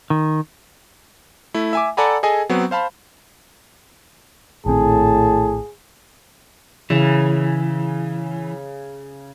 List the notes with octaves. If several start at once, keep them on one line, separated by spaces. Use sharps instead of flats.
D#3
A3 E4
E5 G#5 D6
A4 D5 F#5 G#5 A#5 B5
G#4 A4 D#5 G#5
F#3 B3 C4
C5 F5 A5 B5
A#1 A2 D#3 C4 G#4 A5
C#3 E3